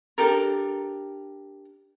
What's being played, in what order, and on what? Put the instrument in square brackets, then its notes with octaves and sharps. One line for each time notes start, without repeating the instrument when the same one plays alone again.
[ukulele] D4 G4 A4 A#4